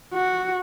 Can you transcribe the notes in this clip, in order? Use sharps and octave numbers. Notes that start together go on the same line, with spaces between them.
F#4